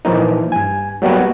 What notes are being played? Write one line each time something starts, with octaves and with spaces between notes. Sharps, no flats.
A#2 E3 F3 A#3 D#4
G2 G#5
F#3 G3 A#3 B3 F#4